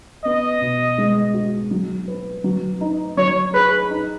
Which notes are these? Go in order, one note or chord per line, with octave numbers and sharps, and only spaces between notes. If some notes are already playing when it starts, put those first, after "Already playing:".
B3 D#5
B2
G#3
F#4
F#3
B4
F#3
D#4
F#3 C#5
G#4 B4
D#4